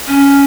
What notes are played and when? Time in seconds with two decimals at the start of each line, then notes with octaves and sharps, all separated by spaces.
0.07 C#4